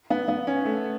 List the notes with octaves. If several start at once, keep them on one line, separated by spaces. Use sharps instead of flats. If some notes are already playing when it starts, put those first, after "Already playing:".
B3
B3
C#4
A3